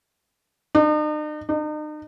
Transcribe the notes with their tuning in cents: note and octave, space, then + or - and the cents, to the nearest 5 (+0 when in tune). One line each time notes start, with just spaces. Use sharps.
D#4 -45
D#4 -40